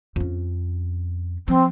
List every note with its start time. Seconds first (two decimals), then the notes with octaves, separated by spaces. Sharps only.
0.16 F2 C#4
1.48 F3 C4